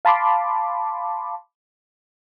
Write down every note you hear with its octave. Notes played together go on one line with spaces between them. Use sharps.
F5 A5 B5 C6 D6